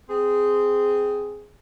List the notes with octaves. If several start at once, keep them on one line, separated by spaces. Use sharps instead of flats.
C4 G#4